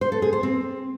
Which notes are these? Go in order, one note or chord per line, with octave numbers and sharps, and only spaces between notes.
C5
A4
G#4
C5
C4